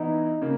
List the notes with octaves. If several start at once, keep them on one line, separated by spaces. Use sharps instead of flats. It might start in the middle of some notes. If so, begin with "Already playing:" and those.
Already playing: E3 B3 D#4 E4
C#3 A#3